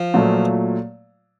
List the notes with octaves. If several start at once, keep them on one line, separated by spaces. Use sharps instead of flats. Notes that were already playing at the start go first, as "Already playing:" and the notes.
Already playing: F3
A#2 F#3 A3